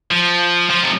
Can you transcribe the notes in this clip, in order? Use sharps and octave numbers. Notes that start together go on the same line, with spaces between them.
F3
F3
C3